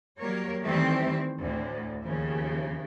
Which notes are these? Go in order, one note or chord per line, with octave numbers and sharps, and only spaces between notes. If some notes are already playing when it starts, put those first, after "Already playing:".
F#3 G3 A#3 A#4 C#5
D#3 E3 G3 A3 C4 E4
D2 A2
D#2 C#3 F3